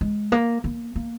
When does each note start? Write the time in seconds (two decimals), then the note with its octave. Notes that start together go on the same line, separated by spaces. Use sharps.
0.01 G#3
0.32 A#3
0.64 A#3
0.96 A#3